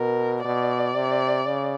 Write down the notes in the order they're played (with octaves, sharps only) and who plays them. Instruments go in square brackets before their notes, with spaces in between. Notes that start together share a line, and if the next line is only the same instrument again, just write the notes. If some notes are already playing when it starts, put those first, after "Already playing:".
Already playing: [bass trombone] B2 [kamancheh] A#4
[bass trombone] B2 [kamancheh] D5
[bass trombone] C3
C#3